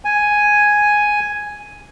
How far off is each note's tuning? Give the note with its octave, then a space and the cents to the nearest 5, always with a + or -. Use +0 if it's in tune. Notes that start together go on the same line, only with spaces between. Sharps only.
G#5 +0